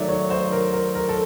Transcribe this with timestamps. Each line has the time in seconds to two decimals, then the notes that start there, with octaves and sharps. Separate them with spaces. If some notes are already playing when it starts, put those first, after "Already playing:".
Already playing: D#3 F#3 A3 D5
0.09 C#5
0.30 C5
0.52 A#4
0.73 A#4
0.95 A#4
1.09 A4